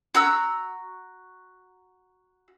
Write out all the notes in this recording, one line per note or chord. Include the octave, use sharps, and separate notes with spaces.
F#4 A#5 E6